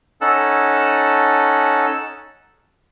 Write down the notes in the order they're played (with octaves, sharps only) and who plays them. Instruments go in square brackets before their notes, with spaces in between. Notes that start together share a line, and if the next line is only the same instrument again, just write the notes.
[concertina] C#4 D#4 A4 F#5 A5 E6